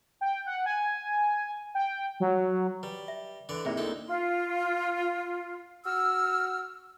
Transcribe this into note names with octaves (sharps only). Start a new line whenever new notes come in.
G5
F#5
G#5
G5
F#3
G3 B4
E5
D3 E3 D5
C3 A#3 D#4 E4 G#4 D5 E5
D2 C4 A4
F4
F#4 E6 F6